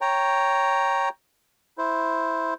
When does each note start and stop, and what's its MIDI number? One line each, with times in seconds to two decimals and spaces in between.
0.01 1.09 73
0.01 1.09 79
0.01 1.09 82
1.78 2.54 64
1.78 2.54 72